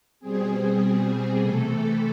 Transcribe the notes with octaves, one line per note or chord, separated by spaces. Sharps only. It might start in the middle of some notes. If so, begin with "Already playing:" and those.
B2 G3 C4 G#4
C3 E3 A3 A4